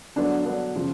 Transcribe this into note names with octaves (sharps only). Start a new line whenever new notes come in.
D3 F#3 B3 D4
D3 F#3 B3 D4
C#3 F3